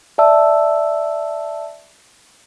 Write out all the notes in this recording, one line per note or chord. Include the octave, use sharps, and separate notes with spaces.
D5 E5 A5 E6